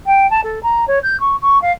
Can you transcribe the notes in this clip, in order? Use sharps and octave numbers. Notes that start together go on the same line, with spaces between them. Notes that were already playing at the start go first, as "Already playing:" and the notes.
G5
A5
A4
A#5
C#5
G6
C#6
C#6
F5